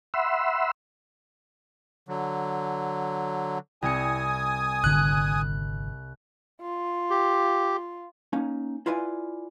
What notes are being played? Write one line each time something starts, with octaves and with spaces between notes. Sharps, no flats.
E5 F#5 B5 C6 E6
D3 F#3
C2 G#5 D#6 C#7
G#1 D3 F#6
F4
G4
A#3 C#4 D#4
E4 F4 B4 D5 G#5